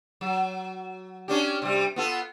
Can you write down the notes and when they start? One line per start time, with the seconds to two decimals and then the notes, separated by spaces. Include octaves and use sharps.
0.21 F#3
1.28 C#4 D4 G4
1.62 C3 G3
1.96 B3 F4 A4